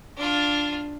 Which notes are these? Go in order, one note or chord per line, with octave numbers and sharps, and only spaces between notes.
D4 F4